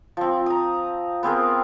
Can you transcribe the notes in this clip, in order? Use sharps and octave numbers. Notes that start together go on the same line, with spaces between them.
F3 C4
A#5 D#6
B3 C4 G#4 A#4